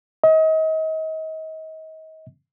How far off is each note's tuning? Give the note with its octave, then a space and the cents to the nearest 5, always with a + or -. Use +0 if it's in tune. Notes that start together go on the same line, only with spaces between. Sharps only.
D#5 +35